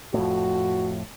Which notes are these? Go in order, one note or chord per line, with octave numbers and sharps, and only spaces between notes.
F2 A2 F#4